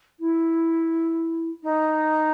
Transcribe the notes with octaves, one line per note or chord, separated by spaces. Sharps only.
E4
D#4